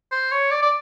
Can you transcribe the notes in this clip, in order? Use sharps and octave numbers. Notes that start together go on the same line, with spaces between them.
C5
C#5
D5
D5